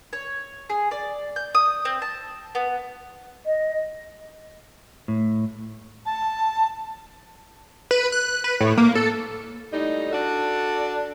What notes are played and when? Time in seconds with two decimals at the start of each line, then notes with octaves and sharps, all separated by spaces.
0.13 C#5
0.70 G#4
0.91 D5
1.36 G6
1.55 D#6
1.85 C4
2.02 A5
2.55 B3
3.46 D#5
5.08 A2
6.06 A5
7.91 B4
8.12 F#6
8.44 B4
8.60 A2
8.77 A#3
8.95 A4
9.72 A2 G3 D#4
10.12 D4 F#4 A4 D5